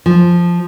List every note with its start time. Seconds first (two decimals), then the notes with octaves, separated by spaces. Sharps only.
0.06 F3